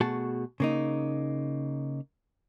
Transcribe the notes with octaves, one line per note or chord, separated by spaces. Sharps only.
B2 A3 F#4 G#4 A5
C#3 A#3 D#4